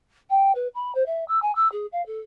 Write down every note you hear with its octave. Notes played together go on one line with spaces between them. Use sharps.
G5
B4
B5
C5
E5
E6
G#5
E6
G#4
F5
A4